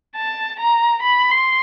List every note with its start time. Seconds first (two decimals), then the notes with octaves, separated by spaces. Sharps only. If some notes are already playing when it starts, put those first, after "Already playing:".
0.17 A5
0.59 A#5
1.03 B5
1.31 C6